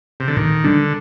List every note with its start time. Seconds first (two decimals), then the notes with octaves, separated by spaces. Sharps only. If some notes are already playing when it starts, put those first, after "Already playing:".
0.20 C3
0.28 D3
0.36 A#2 D#3
0.64 D3 G3 D4